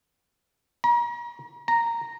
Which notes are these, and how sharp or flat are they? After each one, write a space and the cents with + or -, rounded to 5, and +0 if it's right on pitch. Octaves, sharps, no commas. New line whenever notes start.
A#5 +40
A#5 -5